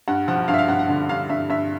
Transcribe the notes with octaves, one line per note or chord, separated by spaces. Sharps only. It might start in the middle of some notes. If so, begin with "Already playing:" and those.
G2 F#5
F3 F#5
G2 F5
E5
F5
G2 F#5
F#5
D3
G2 F5
G2 E5
G2 E5